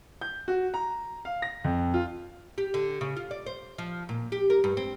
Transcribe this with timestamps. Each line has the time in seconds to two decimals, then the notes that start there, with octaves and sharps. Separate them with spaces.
0.21 G6
0.48 F#4
0.74 A#5
1.25 F5
1.42 A#6
1.64 F2
1.94 F4
2.58 G4
2.74 D3
3.01 C#3
3.16 F4
3.31 D5
3.47 C5
3.78 F3
4.09 A#2
4.32 G4
4.50 A#4
4.64 G2
4.77 C4